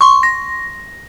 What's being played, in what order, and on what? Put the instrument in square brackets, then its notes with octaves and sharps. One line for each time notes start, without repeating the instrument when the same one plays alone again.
[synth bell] C6 C#6
A#6